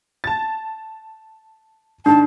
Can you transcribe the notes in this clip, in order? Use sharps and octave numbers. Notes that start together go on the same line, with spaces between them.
A5 A6
G#2 D#3 D4 A5